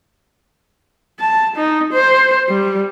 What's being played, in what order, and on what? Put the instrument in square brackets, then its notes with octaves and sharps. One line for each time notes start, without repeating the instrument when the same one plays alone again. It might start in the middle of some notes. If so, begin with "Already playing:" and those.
[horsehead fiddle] A5
D#4
C5
G3